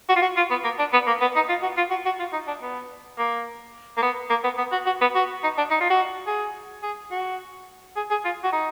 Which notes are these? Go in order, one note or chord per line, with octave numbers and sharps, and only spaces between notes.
F#4
F4
F#4
F4
B3
A#3
D4
B3
A#3
B3
D#4
F4
F#4
F4
F#4
F#4
F4
D#4
D4
B3
A#3
A#3
B3
A#3
B3
B3
F#4
F#4
B3
F#4
D#4
D4
D#4
F4
F#4
G#4
G#4
F#4
G#4
G#4
F4
F#4
D#4